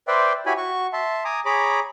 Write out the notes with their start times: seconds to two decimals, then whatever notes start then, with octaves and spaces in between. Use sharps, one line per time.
0.08 B4 C5 D5 E5 G5 C6
0.46 E4 F#4 G4 C#5 G#5 B5
0.57 F#4 C#6
0.93 E5 A5 C6
1.24 G#5 A#5 D6 D#6
1.45 G#4 C#5 A#5 B5 D6